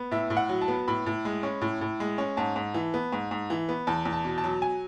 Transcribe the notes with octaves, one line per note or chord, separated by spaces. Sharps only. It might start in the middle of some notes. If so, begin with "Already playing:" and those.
Already playing: B3
A2 E5
A2
F#5
F#3
A5
B3
A2 B5
A2
G#3
C#4
A2
A2
G#3
C#4
G#2 A5
G#2
E3
B3
G#2
G#2
E3
B3
E2 A5
E2
A5
B2
A5
F#3
G#5